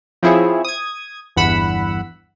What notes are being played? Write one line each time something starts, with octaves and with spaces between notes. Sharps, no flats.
F3 C4 E4 G#4 C#5
D#6 G#6
G1 E2 G2 F#5 B5 E6